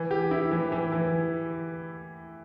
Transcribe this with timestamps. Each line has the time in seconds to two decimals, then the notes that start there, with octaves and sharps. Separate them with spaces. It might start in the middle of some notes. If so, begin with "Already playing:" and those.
Already playing: E3
0.11 G4
0.31 E4
0.52 E3
0.72 E3
0.92 E3